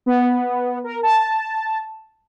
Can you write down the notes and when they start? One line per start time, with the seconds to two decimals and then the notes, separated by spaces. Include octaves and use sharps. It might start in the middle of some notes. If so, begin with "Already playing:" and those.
0.06 B3
0.84 A#4
1.03 A5